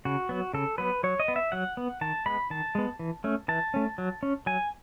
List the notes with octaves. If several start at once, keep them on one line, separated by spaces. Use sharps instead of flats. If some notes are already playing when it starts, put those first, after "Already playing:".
C#3 F#4
F#3 B3
C#3 A4
F#3 B3 B4
F#3 C#5
D#5
B3
E5
F#3 F#5
B3
D#3 A5
G#3 B3 B5
D#3 A5
G#3 B3
E3
A3 C#4
E3 A5
A3 C#4
F#3
C#4
F#3 G#5